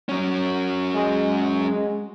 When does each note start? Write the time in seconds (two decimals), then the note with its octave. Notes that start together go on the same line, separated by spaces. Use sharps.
0.09 F#3 C#4
0.93 G#3